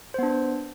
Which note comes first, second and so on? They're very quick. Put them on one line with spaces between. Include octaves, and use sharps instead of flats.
C5 B3 D4